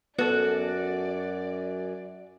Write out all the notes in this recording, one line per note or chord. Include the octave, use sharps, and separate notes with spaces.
F#2 B3 F#4 A4 D5